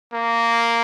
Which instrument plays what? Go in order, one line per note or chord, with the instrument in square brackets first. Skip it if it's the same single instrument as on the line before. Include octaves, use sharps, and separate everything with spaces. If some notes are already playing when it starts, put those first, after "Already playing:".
[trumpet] A#3